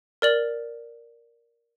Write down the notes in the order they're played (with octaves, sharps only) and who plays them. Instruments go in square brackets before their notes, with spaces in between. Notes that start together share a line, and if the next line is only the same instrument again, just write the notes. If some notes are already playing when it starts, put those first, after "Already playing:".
[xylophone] A#4 D5 F#7